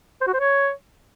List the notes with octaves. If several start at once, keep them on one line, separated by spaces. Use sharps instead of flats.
C5
F#4
C5
C#5